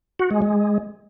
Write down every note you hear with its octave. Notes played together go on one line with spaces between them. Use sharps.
F#4
G#3
G#3